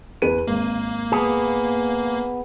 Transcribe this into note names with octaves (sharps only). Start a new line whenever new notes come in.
E2 B4 D#7
G#1 A#3
B3 G#4